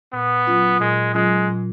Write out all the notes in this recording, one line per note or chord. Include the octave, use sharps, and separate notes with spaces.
A#2 B3
F#3 C#4 F4
A#2 G#3
F#3 G#3 C#4 F4
A#2